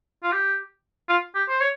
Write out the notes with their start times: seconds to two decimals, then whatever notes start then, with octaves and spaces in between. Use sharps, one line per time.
0.23 F4
0.32 G4
1.09 F4
1.35 G4
1.49 C5
1.60 C#5